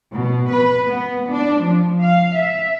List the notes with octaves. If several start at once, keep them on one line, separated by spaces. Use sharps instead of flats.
B2
B4
B3
D4
F3
F5
E5